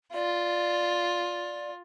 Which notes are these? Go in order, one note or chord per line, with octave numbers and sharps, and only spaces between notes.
F4 D5